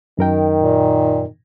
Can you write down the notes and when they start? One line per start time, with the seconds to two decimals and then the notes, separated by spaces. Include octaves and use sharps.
0.19 F#2 D#3 A#4 G5
0.61 A#2